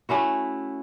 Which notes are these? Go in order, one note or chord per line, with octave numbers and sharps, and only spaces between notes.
A3 C#4 E4 F#4